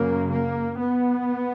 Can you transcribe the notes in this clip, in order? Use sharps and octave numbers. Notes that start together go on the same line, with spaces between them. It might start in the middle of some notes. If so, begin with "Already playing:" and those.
Already playing: F#2 C#3 A#3
A#3
B3